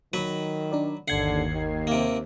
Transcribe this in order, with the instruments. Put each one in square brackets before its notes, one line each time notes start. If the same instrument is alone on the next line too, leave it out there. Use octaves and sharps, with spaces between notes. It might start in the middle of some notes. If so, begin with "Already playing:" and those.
[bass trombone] D#3 [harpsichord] F#3 B4
[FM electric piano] D4 A#4 D5
[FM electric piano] G1 G#6 C7 [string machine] D#2 [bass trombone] D3 [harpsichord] F#5
[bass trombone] D#3
[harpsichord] C3 A#3